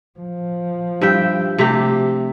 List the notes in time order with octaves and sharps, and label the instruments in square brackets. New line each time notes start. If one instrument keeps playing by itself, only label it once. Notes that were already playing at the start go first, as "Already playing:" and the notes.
[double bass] F3
[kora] G2 E5 G5
C3 A3 G4